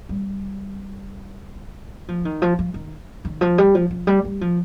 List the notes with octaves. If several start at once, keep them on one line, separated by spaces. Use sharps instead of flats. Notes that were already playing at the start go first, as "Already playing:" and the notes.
G3
F3
D#3
F3
F3
D#3
D#3
F3
G3
F3
F3
G3
G3
F3